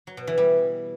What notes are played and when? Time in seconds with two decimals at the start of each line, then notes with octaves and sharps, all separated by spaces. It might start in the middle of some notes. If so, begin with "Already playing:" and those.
0.07 F#3
0.17 B2
0.27 E3
0.38 G3